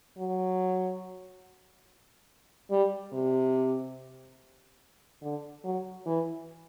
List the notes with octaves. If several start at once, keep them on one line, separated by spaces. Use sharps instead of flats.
F#3
G3
C3
D3
F#3
E3